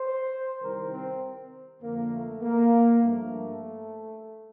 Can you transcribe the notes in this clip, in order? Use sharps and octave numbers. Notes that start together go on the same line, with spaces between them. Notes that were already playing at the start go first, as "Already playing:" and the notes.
Already playing: C5
C2 C3 D#3 G3 A#4
C4
F2 D3 F3 A#3
A3
A#3
G2 F3 A3